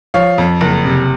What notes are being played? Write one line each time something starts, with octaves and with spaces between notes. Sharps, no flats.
F3 C#5 F5
F2
F#1
C3